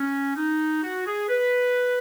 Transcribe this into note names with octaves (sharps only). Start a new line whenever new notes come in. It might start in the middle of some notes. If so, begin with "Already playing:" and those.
Already playing: C#4
D#4
F#4
G#4
B4